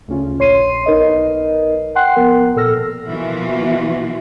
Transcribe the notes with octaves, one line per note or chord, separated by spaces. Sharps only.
D2 C#3 C#4 F4
A#1 A#2 C#5 C6 C7 D#7
B1 D#4 A#4 B4 D#5
F#5 G5 C6 F#6 C7
A1 F3 B3 A#4
A#2 A4 E6 F6 A#6
B2 E3 F3 A#3 F4 F#4